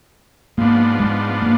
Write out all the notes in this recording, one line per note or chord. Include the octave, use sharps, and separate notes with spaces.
G#2 F3 A#3 B3 D4
G#3
A#3